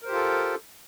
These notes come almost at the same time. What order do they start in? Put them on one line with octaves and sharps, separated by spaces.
A#4 C5 G4 F4 A4